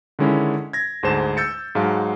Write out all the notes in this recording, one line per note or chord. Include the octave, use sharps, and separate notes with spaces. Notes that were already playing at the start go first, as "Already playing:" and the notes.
D3 D#3 G#3 C#4 E4
G#6 A#6
D2 G#2 G#3 C5 A5 E7
E6 G6 A6 C#7
G#2 F#3 G#3 F5 A5